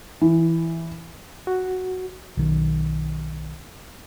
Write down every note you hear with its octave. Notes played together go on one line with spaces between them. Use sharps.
E3
F#4
B1 D#3